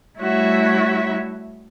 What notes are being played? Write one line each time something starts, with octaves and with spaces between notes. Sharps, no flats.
G3 A3 E4 F#4 C#5 E5